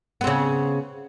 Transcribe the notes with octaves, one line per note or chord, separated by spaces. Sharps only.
C#3 B3 C4